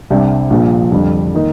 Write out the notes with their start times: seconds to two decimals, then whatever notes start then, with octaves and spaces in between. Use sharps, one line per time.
0.10 C2 C3 G3 D4
0.50 A#1 A#2 F3
0.92 F2 D3 G3
1.33 D#3 A#3 D#4 A#4